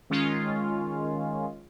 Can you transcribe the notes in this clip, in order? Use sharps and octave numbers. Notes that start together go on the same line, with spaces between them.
D#3 G#3 C#4 F4